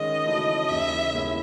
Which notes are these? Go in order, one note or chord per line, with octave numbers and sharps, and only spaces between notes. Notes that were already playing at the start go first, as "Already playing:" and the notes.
Already playing: D#3 G#3 C#4 D#5
C#3 E3 A3 D#4 F#4
D#2 C#3 E3 E5
D#2 C#3 G#3 B3 E4